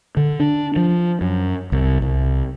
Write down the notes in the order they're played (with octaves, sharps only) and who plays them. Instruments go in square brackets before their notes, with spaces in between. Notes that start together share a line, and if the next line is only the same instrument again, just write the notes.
[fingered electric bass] D3
D4
F3
F#2
C2
C2